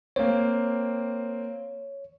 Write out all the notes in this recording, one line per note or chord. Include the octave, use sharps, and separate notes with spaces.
A#3 C4 C#5